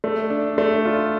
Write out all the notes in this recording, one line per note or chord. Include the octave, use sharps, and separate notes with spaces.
A3
D4
A3
F4